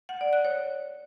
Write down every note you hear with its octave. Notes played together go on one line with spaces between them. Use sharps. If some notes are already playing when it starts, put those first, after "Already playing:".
F#5
D5
F#6
C#5